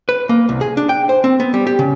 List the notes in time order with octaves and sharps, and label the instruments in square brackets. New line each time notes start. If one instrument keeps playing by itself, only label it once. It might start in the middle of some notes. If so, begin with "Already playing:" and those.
[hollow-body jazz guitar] B4
A#3
C2
G#4
D4
G5
C5
C4
B3
G3
G4
C#3